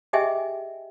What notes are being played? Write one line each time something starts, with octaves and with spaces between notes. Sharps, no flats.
G4 G#4 D#5 E5 G5 G#5